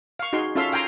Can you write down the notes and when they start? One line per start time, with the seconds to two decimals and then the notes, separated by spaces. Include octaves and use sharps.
0.19 F5 C#6
0.33 D#4 F#4 G#4 C6
0.56 C#4 F4 A4 E5 F5 C6
0.72 F5 G5 G#5 A#5 C6